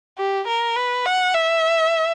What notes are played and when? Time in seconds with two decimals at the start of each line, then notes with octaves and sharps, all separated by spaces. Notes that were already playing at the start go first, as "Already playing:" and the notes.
0.17 G4
0.47 A#4
0.76 B4
1.06 F#5
1.35 E5